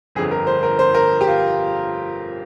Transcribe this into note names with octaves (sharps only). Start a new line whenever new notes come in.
G1 F2 D3 G#4
A#4
C5
A#4
C5
A#4
G4
F4